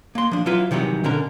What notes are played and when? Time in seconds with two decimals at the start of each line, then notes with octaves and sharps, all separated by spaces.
0.15 A#3 C6
0.32 F3 D4
0.46 F#3 E4 F4 B4
0.71 C3 D#3 E3 F#3 G3
1.04 B2 D3 C#4 A#4